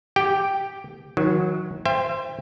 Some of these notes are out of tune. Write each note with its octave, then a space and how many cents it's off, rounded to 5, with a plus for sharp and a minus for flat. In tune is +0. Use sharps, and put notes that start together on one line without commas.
G4 +0 G5 +0
D#3 +30 F#3 -15
C5 +0 E5 +35 G5 +30